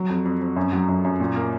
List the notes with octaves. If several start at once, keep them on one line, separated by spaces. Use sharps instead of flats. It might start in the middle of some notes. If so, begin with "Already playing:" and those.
Already playing: F#3
F2
F2
F2
F#2
F#3
F#2
F#2
A#2
A#3